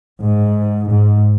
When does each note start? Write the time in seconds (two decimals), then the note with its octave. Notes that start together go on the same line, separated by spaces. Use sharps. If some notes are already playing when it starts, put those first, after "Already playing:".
0.21 G#2
0.88 G#2